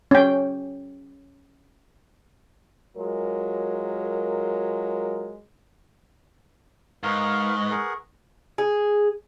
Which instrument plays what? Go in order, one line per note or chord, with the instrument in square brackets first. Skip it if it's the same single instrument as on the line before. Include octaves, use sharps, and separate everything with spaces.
[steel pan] C#4 G5
[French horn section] F#3 G#3 F4 A#4
[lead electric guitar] G#2 [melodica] A#4 F5 [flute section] B4 C#6 D#6
[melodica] G#4 A#4 F#5
[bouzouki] G#4